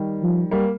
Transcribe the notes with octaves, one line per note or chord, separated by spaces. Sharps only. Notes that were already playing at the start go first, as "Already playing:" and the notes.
Already playing: D#3 G3
F3
G3 A#3